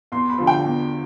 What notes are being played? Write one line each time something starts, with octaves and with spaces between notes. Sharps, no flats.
E2 C6
B5
D3 F3
G5
E2